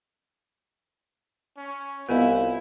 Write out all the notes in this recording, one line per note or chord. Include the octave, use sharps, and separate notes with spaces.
C#4
C2 B3 E4 F4 B4 D#5 F5 G#5